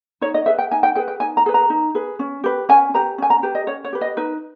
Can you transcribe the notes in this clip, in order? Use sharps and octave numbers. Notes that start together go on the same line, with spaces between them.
D#4 C#5
D#5
G#4 B4 E5
G5
D#4 G#5
G5
G#4 B4 G5
G5
D#4 G#5
A#5
G#4 B4
A#5
D#4
G#4 B4
C#4
G4 B4
C#4 G#5
G4 B4 A#5
C#4 G#5
A#5
G4 B4
D#5
C#4 C#5
C#5
G4 B4
D#5
D#4 B4